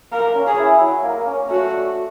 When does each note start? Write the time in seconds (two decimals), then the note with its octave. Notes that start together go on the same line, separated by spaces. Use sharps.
0.12 A#3 A#4
0.35 C#4
0.47 G#4
0.58 E4
0.80 F#3
1.03 A#3
1.27 C#4
1.50 A3 F#4
1.72 D4